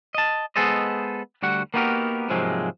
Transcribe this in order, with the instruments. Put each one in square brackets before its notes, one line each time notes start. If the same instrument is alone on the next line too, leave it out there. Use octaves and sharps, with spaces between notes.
[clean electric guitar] D#5 A5
G#3 B3 G#4 A4 C5 D#5
D2 G3 F#4 F#5
A#3 B3 D#4 F#4 G4 A#4
G#2 C3 F3 F#3 G#3 A#3